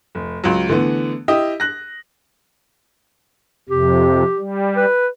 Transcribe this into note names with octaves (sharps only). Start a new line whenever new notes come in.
F1
C#2 F#3
D3 E3 A3 B3
E4 G4 D#5
F#6 A#6
F2 C3 G4
G3
B4